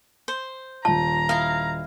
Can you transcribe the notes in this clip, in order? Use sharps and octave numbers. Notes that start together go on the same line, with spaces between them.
C5
D#1 F4 A5 A#5
E4 D#5 F5